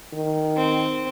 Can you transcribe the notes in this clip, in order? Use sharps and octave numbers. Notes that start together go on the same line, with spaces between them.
D#3
C4